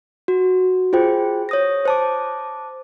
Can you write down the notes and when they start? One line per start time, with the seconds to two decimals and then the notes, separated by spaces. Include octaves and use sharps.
0.28 F#4
0.93 F4 G#4 C5 G5
1.49 C#5 D#6 A#6
1.85 C5 A5 D6